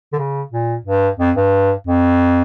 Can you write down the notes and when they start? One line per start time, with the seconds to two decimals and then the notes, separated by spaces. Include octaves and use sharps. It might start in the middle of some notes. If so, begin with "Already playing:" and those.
0.13 D3
0.19 C#3
0.52 A#2
0.85 G2
1.19 F2
1.36 G2
1.87 F2